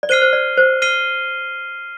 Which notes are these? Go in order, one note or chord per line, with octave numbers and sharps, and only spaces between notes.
D5
C5 F6 C7 D#7 G7
C5
D5
C5
F6 C7 D#7 G7